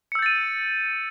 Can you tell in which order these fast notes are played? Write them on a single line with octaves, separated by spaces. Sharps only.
C#7 E6 G6 A6 D#7